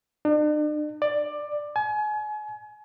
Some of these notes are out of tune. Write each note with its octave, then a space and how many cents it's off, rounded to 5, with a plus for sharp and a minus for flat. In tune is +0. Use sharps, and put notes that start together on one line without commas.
D4 +45
D5 +15
G#5 +35